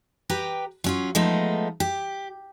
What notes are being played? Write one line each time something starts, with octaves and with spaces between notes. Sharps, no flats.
G4 B4 G5 A#5
F#3 C#4 F4
F3 G#3 A3 B3 D#4
G4